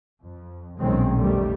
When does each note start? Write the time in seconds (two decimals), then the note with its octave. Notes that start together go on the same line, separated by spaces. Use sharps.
0.22 F2
0.78 B1 A#2 D#3 G#3 C4 C#4
1.17 F1 D#3 G3 A3